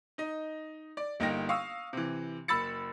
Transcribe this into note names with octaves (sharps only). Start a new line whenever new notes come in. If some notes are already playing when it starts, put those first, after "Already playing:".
D#4 D#5
D5
G1 A#3 D#4 G5 A#6
F5 C#6 D#6 E6
C3 E3
F#1 B5 E6 A6 C#7